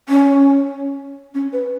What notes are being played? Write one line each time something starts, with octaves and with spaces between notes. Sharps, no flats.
C#4
C#4
B4